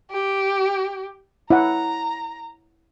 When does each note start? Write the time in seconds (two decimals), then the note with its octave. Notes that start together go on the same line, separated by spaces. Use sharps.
0.11 G4
1.50 E4 C#5 F#5 A#5